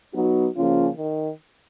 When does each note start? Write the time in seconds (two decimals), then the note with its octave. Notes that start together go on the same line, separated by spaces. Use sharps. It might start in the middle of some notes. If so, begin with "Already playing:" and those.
0.14 F#3 B3 D#4 F#4
0.56 C#3 F3 A#3 C#4 F4
0.96 D#3